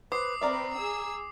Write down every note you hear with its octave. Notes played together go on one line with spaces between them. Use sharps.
B4 C5 D6 D#6 C7
C4 A#4 B4 D5 E5 A#5
G#4 E6